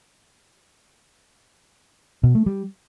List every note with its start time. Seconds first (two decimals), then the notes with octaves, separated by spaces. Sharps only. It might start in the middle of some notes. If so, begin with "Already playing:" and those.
2.23 B2
2.35 A3
2.46 G3